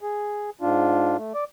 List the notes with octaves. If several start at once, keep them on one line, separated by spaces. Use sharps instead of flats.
G#4
G#2 D4 F4
A3
D5